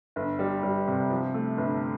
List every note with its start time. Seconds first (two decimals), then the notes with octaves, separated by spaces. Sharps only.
0.16 G1
0.39 G3
0.63 G3
0.87 C3
1.11 F3
1.34 A3
1.58 G1